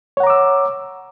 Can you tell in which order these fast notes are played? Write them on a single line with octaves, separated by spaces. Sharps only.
C#5 F#5 A#5 D6 E6